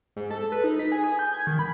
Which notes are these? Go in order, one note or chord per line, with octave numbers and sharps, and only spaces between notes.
G#2
A4
B4
D#4
B6
G#4
G#5
G6
G#6
D#3
B5